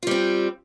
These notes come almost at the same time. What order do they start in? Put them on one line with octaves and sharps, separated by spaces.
F4 G3 C4